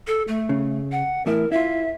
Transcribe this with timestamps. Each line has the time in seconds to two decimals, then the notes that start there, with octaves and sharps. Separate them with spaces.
0.07 A4
0.28 A3
0.49 C#3
0.92 F#5
1.26 E2 A2 E4 A#4
1.52 E4 F4 E5